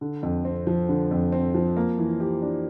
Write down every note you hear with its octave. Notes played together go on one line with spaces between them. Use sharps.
D3
F2
C4
F3
D3
F2
C4
F3
A#3
E3
G4
D4